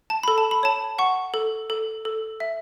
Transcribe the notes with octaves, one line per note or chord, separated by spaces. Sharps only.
A5
A4 B5
A5
B5
C#5 A5
F#5 C#6
A4
A4
A4
E5